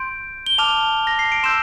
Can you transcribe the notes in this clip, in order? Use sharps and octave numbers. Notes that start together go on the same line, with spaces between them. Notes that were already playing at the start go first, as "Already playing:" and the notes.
Already playing: C6 G6 D7
G7
A5 D6 F6 F7
A#6
C7
D7
C6 E6 G6 E7